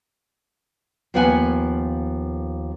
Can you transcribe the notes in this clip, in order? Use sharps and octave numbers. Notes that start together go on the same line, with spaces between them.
D#2 F3 B3 A#4 F#5 G#5